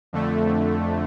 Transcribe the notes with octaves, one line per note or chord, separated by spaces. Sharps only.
F2 D3 A3